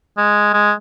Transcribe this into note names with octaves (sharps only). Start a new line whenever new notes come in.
G#3
G#3